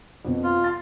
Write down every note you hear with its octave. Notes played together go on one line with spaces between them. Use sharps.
F2 B2
F4
C6 A6